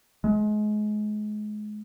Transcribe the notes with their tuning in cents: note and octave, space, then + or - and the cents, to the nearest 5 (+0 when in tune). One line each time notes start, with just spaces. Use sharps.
G#3 +30